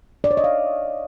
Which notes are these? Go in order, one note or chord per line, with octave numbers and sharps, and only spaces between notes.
D5
C#5
D#5
F5